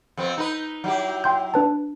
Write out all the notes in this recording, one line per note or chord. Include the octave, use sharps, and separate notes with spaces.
F2 B3 C4
D#4 B4
F#3 E4 G4
G5 C6 G6
D4 B4 A5